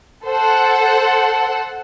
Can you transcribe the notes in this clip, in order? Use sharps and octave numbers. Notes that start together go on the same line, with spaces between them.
A4 C5 F#5